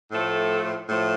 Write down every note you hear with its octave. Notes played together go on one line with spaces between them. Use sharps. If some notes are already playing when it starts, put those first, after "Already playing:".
A2 F3 A3 A4
A2 F3 A3